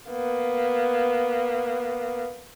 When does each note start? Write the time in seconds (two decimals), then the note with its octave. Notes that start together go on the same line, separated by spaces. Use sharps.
0.10 A#3 B3